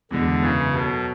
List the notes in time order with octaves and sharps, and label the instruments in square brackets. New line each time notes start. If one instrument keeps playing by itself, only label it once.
[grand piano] E2 B2 G#3 D4 [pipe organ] D3
[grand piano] F#2 E3 B3 [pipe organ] C#3
[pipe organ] B2 [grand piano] F#3 B3 F#4 A4